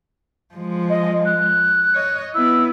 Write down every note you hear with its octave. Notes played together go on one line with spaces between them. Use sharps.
F3 G#3
D#5
F#6
C#5 D#5
B3 E4 E6